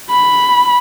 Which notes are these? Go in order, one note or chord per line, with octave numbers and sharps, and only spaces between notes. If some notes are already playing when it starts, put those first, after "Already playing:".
B5